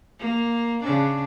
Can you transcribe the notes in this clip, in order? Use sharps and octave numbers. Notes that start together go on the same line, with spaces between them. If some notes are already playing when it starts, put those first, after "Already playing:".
A#3
C#3 D4